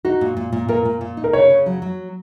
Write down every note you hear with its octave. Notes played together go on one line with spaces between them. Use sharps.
D#4 F#4
A#2
A#2
A#2
A#2 A#4
A#2
A#2
D#4
A#4
C#3 C#5
C#3
F#3
F#3